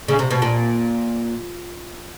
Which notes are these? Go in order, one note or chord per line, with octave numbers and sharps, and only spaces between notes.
C#3
C3
B2
A#2